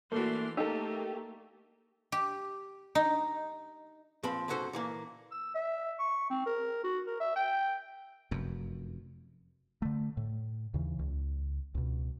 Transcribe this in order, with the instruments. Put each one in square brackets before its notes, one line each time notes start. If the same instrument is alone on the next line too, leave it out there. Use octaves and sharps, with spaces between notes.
[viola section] E3 D4 C6 [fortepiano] A3 F#4 [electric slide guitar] A#3
[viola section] A3 A#3 [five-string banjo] D#4 A4 [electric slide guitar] G4 [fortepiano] E6
[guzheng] G4
D#4
[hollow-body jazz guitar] A#2 F3 C4 B4 B5
B1 G#2 C#4 F#4 A4 C5
A#2 E3 A#3
[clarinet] E6
E5
C#6
C4
A#4
F#4
A#4
E5
G5
[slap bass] F1 F#2
[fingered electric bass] D3 A3
A2
D#2 C#3 E3
C#2
C#2 B2